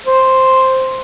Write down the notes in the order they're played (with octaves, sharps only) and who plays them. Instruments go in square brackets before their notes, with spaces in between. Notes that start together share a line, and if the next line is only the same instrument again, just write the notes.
[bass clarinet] C5